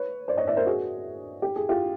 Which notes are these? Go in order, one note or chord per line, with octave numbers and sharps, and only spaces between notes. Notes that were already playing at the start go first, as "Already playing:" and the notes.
Already playing: B4 C#5
C5 D5
C#5 D#5
D5 E5
A#4 C5
F#4 G#4
G4
G#4
F4 G4